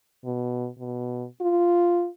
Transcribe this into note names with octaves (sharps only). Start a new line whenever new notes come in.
B2
B2
F4